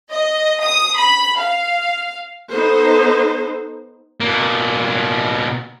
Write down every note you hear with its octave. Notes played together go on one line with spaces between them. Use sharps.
D#5
D#6
B5
F5
B3 D#4 A4 C5
B2 A#3